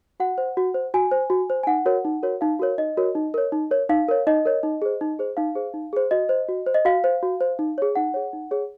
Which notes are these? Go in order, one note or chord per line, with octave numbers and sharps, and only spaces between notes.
F#4 F#5
C5
F#4
C5
F#4 G#5
C5
F#4
C5
G#5
D#4 F#5
F#4 A#4 C#5
D#4
F#4 A#4 C#5
D#4 F5
F#4 A#4 C#5
D#4 D#5
F#4 A#4 C#5
D#4
A#4 C#5
D#4
A#4 C#5
D#4 F5
A#4 C#5
D#4 D#5
A#4 C#5
D#4
G#4 C5
D#4
G#4 C5
D#4 F5
G#4 C5
D#4
G#4 C5
F#4 D#5
C5
F#4
C5
D#5
F#4 F5
C5
F#4
C5
D#4
G#4 C#5
D#4 F#5
G#4 C#5
D#4
G#4 C#5